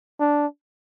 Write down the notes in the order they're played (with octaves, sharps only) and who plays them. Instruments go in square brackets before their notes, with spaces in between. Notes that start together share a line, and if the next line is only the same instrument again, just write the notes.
[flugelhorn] D4